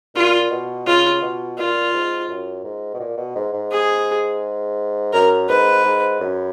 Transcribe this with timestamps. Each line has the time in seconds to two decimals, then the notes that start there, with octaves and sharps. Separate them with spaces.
0.15 A#2 F4
0.51 B2
0.87 C#3 F4
1.22 B2
1.58 A#2 F4
1.93 G#2
2.29 F#2
2.64 G#2
2.94 B2
3.00 A#2
3.17 B2
3.36 G#2
3.53 G#2
3.71 G#4
5.13 F#2 A#4
5.49 G#2 B4
5.85 G#2
6.21 F#2